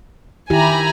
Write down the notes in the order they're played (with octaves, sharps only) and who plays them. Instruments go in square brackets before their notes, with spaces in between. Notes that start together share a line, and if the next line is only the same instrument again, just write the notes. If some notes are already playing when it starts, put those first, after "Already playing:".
[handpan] D#3 E4 G4 [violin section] G#5 A#5 B5